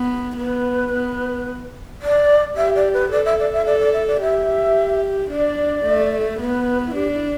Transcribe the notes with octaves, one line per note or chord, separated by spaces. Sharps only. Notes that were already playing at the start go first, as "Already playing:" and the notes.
Already playing: B3
B3 B4
B3
D5
G4 E5
D5
B4
A4 D5
E5
D5
E5
A4 D5
D5
E5
D5
G4 E5
D4 D5
A3
B3 B4
E4
D4 G4
E4